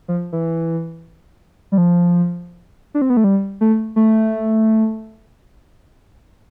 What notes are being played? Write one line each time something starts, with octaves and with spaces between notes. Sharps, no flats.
F3
E3
G3
F3
D4
C4
B3
A3
G3
A3
A3